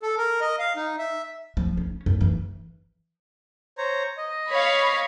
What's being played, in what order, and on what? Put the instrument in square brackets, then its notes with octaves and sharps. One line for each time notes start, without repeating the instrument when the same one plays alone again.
[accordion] A4
A#4
D#5
F5
D#4
E5
[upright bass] F3
C#4
F#2
E3
[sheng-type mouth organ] C5 C#5 A#5
D#5
[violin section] C#5 F5 B5